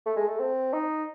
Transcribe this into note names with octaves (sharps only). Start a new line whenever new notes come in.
A3
G#3
A3
C4
D#4